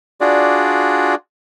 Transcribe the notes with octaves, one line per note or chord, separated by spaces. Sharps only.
D4 F4 F#4 G#4 D5